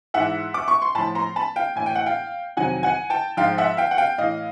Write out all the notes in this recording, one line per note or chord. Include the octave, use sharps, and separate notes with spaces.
G#2 E3 E5 F#5
D6
C#6
C6
A2 F3 A5 B5
A#5 C6
A5 B5
F5 G5
A2 E3 G#5
G5
F#5
F5 G5
F2 C3 D#3 F#3 F#5 G#5
F#5 G#5
G5 A5
G#2 F3 F5 G5
E5 F#5
F5 G5
F#5
F5 G5
A2 E3 D#5 F5